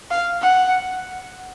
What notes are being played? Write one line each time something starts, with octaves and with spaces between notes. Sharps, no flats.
F5
F#5